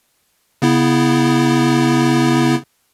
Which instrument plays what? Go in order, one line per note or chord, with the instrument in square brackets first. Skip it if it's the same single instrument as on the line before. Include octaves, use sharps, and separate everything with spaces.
[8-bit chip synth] C#3 B3 E4